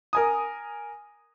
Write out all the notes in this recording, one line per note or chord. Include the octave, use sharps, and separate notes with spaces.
A#4 G#5 D#6